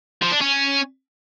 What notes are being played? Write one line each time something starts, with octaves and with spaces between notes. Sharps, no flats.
F3
D4
C#4